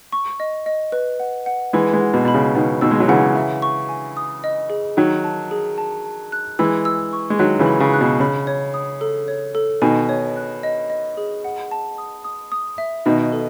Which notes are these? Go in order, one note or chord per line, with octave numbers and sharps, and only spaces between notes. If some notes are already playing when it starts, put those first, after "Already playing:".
C#6
D#5
D#5
B4
F#5
F#5
E3 G#3 B4
E3 G#3
F#5
B2
B2 B5
C#3
B2 D#3 F#5
B2 D#3 E6
G#3
F#3
C#3 E3 F#5
E5
C#6
G#5
D#6
D#5
G#4
D#3 F#3 G#4
A5
G#4
A5
A5
F#6
E3 G#3 E6
E6
C#6
G#3
D#3 F#3 F#6
C#3 E3
B5
C#3
F#6
B2
C#3 B5
C#5
D#6
A4
C#5
A4
B2 D#3 G#5
C#5
F#6
D#5
D#5
G#4
F#5
A5
D#6
D#6
D#6
E5
B2 D#3 D#5
A4